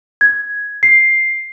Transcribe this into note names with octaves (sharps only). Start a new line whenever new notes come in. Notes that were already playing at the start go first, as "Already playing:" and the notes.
G#6
C7